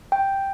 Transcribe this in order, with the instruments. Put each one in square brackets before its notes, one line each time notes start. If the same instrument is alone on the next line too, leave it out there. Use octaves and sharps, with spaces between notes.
[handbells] G5